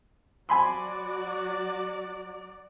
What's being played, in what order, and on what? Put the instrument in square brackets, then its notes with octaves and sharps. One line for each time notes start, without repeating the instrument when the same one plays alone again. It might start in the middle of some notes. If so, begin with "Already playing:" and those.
[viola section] F#3 F#4 D5 [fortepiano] G#5 B5 C6